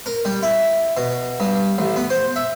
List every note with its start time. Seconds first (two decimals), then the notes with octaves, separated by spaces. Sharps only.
0.06 A#4
0.25 G3
0.43 E4
0.97 B2
1.40 G2
1.78 A1
1.96 B3
2.10 C5
2.36 E5